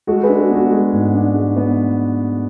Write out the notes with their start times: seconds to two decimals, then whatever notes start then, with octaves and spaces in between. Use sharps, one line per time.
0.07 G#3 F#4 A4
0.23 G#4 B4
0.29 D4
0.39 F#4 A4
0.50 B3 F#4
0.71 G#3 F#4
0.93 G#2
1.15 D4
1.35 G#3
1.57 B3